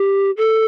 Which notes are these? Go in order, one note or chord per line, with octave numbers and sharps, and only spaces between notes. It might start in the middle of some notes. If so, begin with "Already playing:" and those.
Already playing: G4
A4